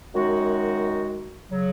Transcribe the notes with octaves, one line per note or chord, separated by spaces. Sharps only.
F#2 D#3 G#3 D#4 F#4
C#3 F#3